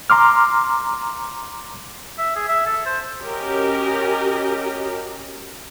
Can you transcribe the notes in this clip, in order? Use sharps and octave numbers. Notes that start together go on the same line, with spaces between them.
A#5 C6 D6 F6
E5
G#4
E5
A4
C5
C#4 F#4 G4 A#4 D#5